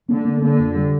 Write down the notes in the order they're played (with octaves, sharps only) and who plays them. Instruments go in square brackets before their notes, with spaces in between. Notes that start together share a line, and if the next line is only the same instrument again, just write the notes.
[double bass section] D3 [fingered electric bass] A#3
[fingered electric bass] A#3
[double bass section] D3 [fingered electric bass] A#3
[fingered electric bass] F2
G3